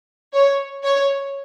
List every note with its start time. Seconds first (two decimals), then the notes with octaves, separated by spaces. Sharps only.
0.33 C#5
0.84 C#5